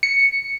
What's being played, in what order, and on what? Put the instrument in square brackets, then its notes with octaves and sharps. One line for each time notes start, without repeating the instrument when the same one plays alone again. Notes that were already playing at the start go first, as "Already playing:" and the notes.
[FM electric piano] C#7